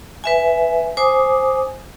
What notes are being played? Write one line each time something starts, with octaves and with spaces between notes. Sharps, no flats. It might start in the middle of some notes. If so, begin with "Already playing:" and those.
B4 E5 G#5
C5 G#5 D6 D#6